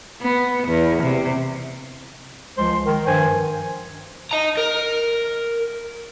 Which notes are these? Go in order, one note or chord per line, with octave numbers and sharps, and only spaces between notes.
B3
E2
C3
C#2 F3 G#3 C5 C6
D#3
G2 D#3 F3 C5 G#5
D#5 A#5
A#4